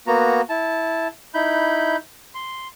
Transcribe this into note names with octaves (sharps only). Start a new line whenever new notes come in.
A#3 B3 F#4 A#5
E4 A5
D#4 E4 B5 G6
C6